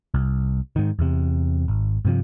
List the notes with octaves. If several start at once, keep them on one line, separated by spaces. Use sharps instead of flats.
C2
G#2 D#3
E2 C3
G#1
G2 C3 F3